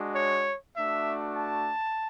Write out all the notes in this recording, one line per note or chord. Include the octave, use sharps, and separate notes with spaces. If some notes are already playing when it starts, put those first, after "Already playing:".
Already playing: G#3 D4 F#4
C#5
A3 D4 F#4 E5
A5